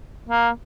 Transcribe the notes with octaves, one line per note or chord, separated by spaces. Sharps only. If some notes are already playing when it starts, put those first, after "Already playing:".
A#3